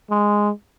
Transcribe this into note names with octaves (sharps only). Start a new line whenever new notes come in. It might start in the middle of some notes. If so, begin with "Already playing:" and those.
G#3